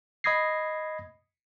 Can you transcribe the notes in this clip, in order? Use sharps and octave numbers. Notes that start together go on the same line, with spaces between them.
D#5 B5 D#6 G#6 A#6 C7